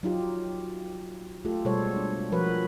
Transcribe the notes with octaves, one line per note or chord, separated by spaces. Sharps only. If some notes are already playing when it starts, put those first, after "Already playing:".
F#3 D#4 F4 G4
A3 F4 G4 A4
B2 G3 G#3 A4 C5 C#5
D4
F3 F#4 A#4 B4 C#5